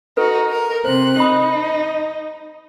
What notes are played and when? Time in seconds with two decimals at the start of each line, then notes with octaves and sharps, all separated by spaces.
0.17 D#4 F#4 A4 B4
0.49 A#4
0.85 C3 C5 F#6
1.18 D#4 G4 B5 D#6